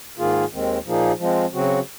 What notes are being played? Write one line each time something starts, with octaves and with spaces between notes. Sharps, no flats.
G#2 D#3 A#3 F4 G#4
D#2 D#3 G#3 C4
A#2 F3 A#3 D#4 G#4
F3 G#3 C4
C#3 F#3 C4 F#4